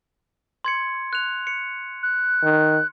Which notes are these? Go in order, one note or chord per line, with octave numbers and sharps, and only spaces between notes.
C6 G#6 C#7
F#6 F7
C#7
F#6
D#3